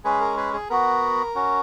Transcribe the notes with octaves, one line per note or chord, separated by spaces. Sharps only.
G#3 C#4 G#4 B4
A#4
G#4 B4
G#4
B3 F#4 A#4
C#4 F#4